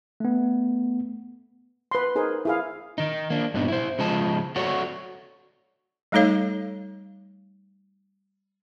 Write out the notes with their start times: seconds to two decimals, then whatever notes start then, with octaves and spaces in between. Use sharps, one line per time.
0.20 A3 B3
1.91 B4 C6
2.15 D#4 G#4 A#4 C5
2.45 E4 G#4 F5
2.98 D#3 D#4
3.30 A#3 D4
3.54 G2 A#2 B3 D4 D#4
3.68 E4 C5
3.99 C#3 F3 G#3 D#5 A5
4.56 F#4 A4 C#5 D5 F#5
6.12 G3 A3 D#4 A4 C#5 F5